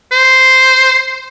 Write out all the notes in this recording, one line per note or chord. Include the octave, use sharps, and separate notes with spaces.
C5